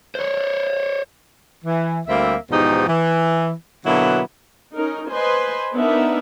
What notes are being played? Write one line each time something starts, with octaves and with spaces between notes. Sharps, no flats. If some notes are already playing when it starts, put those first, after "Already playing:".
C5 C#5
E3
D2 G3 A#3 C4 E5
E2 G#2 B2 F3 D#4 G4
E3
B2 D3 F#3 A#3 B3 E4
C#4 D#4 A#4
B4 C5 D#5 G#5 C6
B3 D4 D#4 A#4 E5